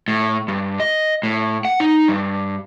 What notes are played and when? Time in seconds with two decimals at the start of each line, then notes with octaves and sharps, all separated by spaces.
0.08 A2
0.48 G2
0.80 D#5
1.23 A2
1.65 F#5
1.80 D#4
2.08 G2